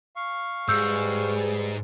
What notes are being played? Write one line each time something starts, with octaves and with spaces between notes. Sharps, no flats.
F5 C#6
G#2 G3 G#4 B4 E6 G6